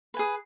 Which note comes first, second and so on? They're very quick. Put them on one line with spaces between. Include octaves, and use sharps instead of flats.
B4 G#5 G#4